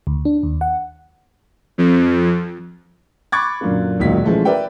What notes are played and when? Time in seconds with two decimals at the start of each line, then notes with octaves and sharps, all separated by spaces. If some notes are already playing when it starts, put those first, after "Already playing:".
0.07 D2
0.25 D4
0.43 D#2
0.61 F#5
1.78 F2
3.32 B5 C#6 D6 F#6 G#6 A6
3.61 F#2 A#2 D3 A#3
4.00 E1 C#2 A#2 D#3 F#3 B6
4.24 E3 F3 G#3 A3 C#4
4.45 A#4 B4 D5 E5 G5